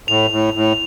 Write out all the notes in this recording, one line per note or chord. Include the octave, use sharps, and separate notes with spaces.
A2 F7
A2
A2